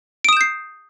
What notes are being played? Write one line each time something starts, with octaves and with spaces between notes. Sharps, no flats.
D#6 G6 C7 D7 E7